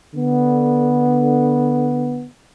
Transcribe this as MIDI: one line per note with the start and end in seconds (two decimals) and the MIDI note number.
0.15 2.27 50
0.15 2.27 59